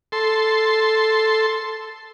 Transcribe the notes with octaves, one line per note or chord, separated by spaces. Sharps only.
A4 C6